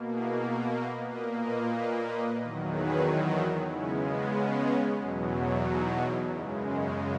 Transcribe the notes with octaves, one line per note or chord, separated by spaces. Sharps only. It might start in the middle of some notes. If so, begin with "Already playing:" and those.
Already playing: B2 A#3
E4 G#4
F#4 A#4
B4 D#5
A#2 A#3 B4 D#5
B4 D#5
B4 D#5
B4 D#5
E2 D#3 F#3
G#4 B4
C#3 G#3 B3 C#4 E4
C#4
E2 B2 F#3
D#4
F#2 C#3 G#3 C#4 E4